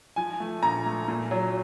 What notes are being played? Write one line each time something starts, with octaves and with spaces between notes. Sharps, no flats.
F3 G#5
A3
A#1 A#5
A3
A#2
F#3